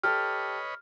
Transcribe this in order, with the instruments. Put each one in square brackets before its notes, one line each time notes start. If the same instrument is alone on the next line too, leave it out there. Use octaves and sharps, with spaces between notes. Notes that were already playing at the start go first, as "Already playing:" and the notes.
[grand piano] G4 A4 [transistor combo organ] B4 C#5 D#5 [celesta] F6